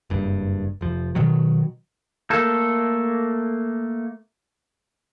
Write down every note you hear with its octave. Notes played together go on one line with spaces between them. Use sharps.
F#1 G2
F1 F3
B2 D#3 F#3
A3 A#3 A4